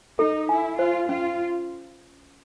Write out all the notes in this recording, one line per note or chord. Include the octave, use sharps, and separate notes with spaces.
D#4 A4
E4 G#5
F4 C5
C#4 F4